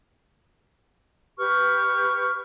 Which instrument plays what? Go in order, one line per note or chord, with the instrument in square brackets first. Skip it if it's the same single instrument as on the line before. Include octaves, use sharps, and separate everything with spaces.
[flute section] G4 B4 C#6 F6